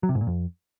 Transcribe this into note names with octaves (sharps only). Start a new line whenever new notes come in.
F#3
C3
G#2
A#2
F2